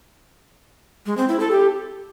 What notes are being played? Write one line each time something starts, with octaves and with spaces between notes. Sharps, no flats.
G#3
C4
E4
A4
G4